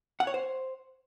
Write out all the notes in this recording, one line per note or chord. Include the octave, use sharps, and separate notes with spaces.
F#5
C#5
C5